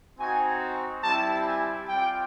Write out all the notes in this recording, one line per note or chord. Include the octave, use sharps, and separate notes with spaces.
C4 D#4 F#4 G#5
G3 C4 E4 G4 A5
G#5
G3 C4 F4 G5